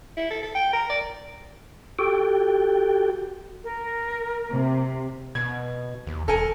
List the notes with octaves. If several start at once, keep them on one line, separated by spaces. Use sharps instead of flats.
E4
A4
A4
G5
A#4
D5
F#4 G4 A4 G5
A#4
C3
B2 G#6
D#2
E1 A4 A#4 G#5